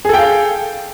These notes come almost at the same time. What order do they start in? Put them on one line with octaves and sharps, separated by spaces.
G#4 A4 G5 F5